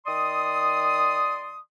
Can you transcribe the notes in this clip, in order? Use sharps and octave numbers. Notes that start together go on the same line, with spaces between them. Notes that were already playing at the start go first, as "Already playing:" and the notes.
D#3 D5 C6 D#6